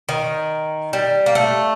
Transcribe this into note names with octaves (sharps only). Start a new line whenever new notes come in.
D#3
G3
A#3
A3